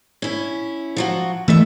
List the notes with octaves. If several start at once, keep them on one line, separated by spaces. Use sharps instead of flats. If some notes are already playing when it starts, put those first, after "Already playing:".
C#4 E4
F3 F#3 F#4
F2 E3 A3 E5